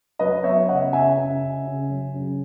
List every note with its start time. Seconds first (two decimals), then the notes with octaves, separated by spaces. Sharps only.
0.19 F#3 B4 D#5
0.44 B3 C#5 E5
0.68 C#3 D#5 F#5
0.93 C#3 E5 G#5
1.17 C#3
1.41 C#3
1.66 C#3
1.90 F#3
2.14 C#3